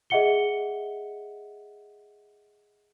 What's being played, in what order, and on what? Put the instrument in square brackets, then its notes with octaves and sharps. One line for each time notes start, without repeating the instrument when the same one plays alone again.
[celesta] G#4 D#5 E5 F#5 C#7 G7